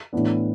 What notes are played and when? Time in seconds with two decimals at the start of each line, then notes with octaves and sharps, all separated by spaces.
0.13 A2 E3 B3 D4